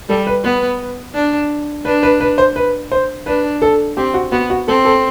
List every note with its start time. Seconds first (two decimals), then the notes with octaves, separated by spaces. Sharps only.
0.09 G3 A4
0.27 B4
0.44 B3 B4
1.15 D4
1.85 D4 B4
2.03 B4
2.20 B4
2.38 C5
2.56 B4
2.92 C5
3.26 D4 B4
3.62 A4
3.97 C4 G4
4.14 F#4
4.32 B3 F#4
4.50 F#4
4.68 C4 A4
4.85 A4